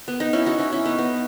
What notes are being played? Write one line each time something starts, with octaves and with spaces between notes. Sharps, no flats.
B3
B3 D#4
C#4 E4
D#4 F#4
C#4 E4
C#4 E4
B3 D#4
B3